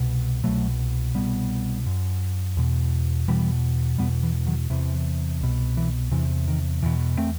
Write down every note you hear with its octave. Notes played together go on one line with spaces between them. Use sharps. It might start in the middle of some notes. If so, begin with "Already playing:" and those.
Already playing: C2 B2
C2 B2 F#3 A3
C2 B2 G3 B3
F#2
E2 B2
E2 B2 E3 G3
E2 B2 G3 B3
E3
D#3 F#3
E2 C3 E3
C2 B2
E3
E2 C3 E3
D#3
E2 B2 E3
A3 C4